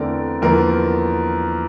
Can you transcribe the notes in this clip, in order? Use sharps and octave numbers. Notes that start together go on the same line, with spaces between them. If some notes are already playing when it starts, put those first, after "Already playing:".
Already playing: E2 D3 A3 C4 A#4 D5
E2 D3 F3 A#3 A#4